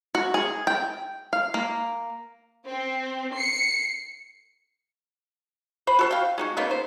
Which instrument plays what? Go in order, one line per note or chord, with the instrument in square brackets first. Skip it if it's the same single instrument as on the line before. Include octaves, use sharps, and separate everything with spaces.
[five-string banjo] F#4
G#4
G5
F5
A#3
[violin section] C4
C7 C#7
[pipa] C5 B5
F#4 A4 C5
F5 G5
G#3 D#4 F#4
C#3 A#3 B3 D#4
C5